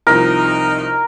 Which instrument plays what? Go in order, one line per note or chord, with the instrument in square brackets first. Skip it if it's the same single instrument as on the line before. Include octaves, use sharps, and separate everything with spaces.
[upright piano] C2 C3 F3 [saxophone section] D#4 [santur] A#4